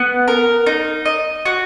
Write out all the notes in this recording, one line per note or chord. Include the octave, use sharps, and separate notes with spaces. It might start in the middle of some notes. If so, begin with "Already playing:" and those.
Already playing: B3
A#4
D#4
D#5
F#4